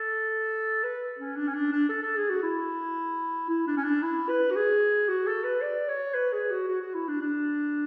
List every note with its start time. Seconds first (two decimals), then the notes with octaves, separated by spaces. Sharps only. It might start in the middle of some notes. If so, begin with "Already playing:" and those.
Already playing: A4
0.83 B4
1.19 C#4
1.37 D4
1.48 C#4
1.54 D4
1.72 D4
1.90 A4
2.02 A4
2.17 G#4
2.30 F#4
2.43 E4
3.49 E4
3.67 D4
3.77 C#4
3.84 D4
4.02 E4
4.29 B4
4.51 F#4
4.56 G#4
5.09 F#4
5.27 A4
5.44 B4
5.62 D5
5.88 C#5
6.15 B4
6.33 G#4
6.51 F#4
6.68 F#4
6.81 F#4
6.95 E4
7.08 D4
7.21 D4